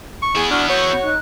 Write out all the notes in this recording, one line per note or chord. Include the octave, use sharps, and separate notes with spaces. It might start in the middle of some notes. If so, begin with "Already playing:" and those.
C#6
B3 E4 G#4 G#5
D4 F#4 C#6 F6
F#4 C#5 G6
D#4 F#6